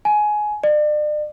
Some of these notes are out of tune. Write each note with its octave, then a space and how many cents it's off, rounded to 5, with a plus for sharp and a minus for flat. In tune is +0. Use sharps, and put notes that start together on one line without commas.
G#5 +15
D5 +40